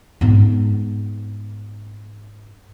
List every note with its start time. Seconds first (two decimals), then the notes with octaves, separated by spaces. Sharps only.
0.21 G#2 B3